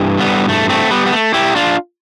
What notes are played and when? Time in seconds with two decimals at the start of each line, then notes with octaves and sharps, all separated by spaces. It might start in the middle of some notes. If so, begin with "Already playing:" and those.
Already playing: G2 E3
0.19 G3 B3
0.49 A3
0.69 A3 C4
0.91 G3 B3
1.06 B3
1.12 A3
1.34 E4 G4
1.56 D4 F4